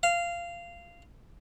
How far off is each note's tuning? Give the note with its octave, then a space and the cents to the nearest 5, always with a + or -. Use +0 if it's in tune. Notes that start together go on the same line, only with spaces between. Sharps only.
F5 -15